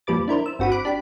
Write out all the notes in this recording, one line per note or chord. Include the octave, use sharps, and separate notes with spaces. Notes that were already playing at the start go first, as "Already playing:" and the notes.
F2 A#2 G3 B4 D6 A6
D4 E4 A#4 C5
E6
G1 C4 F#4 B5 D#7
B5 D6 F#6 D7
D4 G4 B5